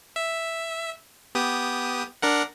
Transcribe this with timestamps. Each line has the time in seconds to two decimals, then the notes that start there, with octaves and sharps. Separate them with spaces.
0.16 E5
1.35 B3 G4 D#6
2.22 D4 A#4 F#5